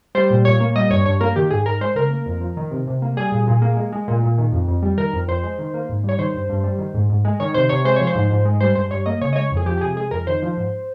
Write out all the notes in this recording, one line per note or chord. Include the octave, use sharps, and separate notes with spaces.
G3 C5
A#2
A#2 C#5
A#3
G3 D#5
G2 C#5
G2 C#5
A#3 A#4
D#3 G4
G#2 G#4
G#2 A#4
G#3 C5
C#3 A#4
A#3
F2
F3
D#3
C3
C3
A#3
G3 G#4
A#2
A#2
A#3
G#3
G#3
A#2
A#2
D#3
F2
F2
G3
D#3 A#4
F2
F2 C5
G#3
D#3
A#3
G#2
G3 C#5
D#3 C5
G2
G2
G3
D#3
G#2
G#2
G#3
D#3 C#5
C3 C5
C3 C#5
G#3 C5
F3 C#5
C5
G#2
G#2
G#3
G3 C5
G2 C5
G2 C#5
A#3 D#5
C#3 C#5
D#5
G#3 C#5
F2
G#4
F3 G4
G4
C3 G#4
G#3 G#4
F2 A#4
D#3 C5
F3
G#2